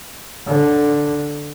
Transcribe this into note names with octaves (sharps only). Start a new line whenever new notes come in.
D3